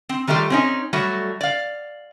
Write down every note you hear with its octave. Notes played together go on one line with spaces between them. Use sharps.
C4
D#3 G3 A3 F4 G4
C4 C#4 D#4
F#3 G3 A3 F#4
D5 F5